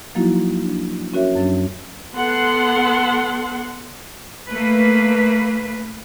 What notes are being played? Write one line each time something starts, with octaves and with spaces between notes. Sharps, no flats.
F3 F#3 A#3 D#4 E4 F#4
D4
C#4 F#4 A#4 C#5 E5
F#2 F#3 C#4 D4
B3 A4 F#5 C6
A3 A#3 B4